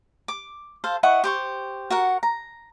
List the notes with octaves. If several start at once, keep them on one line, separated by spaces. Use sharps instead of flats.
D6
A4 C5 F5
E4 D#5 F#5 C#6
G4 C5 C#6
F#4 A#4 F#5
A#5